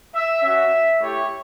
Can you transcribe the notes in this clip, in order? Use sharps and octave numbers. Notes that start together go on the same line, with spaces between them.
E5
C#4 F#4 E5
A3 E4 G4 C#5